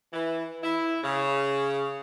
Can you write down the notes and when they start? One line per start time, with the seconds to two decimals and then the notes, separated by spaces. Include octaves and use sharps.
0.11 E3
0.62 E4
1.02 C#3